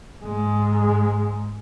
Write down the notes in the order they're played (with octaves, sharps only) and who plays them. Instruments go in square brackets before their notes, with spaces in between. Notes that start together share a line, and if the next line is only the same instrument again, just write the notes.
[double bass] G#2 G#3